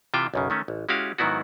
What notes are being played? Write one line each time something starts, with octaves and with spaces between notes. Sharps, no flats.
C3 E3 F4 E5 G5
B1 F#2 C#3
D#3 A3 C#4
A1
G#3 C#4 E4 F#4 G4 F5
G#2 D#3 F#3 B3 E4 F#4